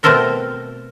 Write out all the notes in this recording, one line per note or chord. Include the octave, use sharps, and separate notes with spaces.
B2 A3 C4 A4 A#4 D5